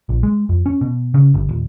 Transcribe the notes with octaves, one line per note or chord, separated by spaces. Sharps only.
A#1
G#3
F2
C#4
B2
C#3
G1
D#1